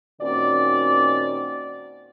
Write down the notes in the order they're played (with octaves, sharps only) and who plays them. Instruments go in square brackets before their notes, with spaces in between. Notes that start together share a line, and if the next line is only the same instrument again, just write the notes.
[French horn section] A#2 D#3 C4 C#4 F#4 D5